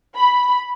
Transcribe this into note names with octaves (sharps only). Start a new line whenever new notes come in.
B5